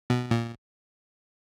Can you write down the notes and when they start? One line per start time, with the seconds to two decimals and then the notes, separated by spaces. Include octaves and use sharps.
0.10 B2
0.31 A#2